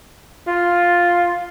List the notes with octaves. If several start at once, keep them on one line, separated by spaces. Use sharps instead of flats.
F4